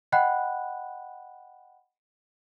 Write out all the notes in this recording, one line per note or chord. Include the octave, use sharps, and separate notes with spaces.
D#5 F#5 G5 B5 F#6